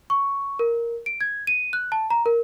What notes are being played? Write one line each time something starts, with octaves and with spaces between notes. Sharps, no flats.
C#6
A#4
D7
G#6
D#7
F#6
A5
A#5
A#4